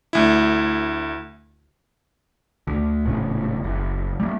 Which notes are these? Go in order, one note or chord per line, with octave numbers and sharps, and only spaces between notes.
D2 E4
D2
D#1 A2 C#3
F#1
G3 A#3